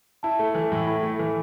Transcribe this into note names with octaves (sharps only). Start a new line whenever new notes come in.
E4 A5
A3
E3
A2
E4 B5
A3
E3